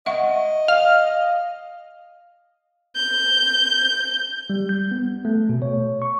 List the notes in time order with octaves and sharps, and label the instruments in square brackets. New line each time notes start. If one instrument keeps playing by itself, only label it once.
[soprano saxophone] D#5 [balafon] E5 F#5 C#6
[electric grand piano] F5 [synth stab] F6
[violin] G6
[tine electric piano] G3
G6
B3
A3
B2
C#5
C#6